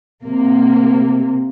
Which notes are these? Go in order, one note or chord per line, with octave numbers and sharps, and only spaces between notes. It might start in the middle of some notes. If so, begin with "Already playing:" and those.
C3 A#3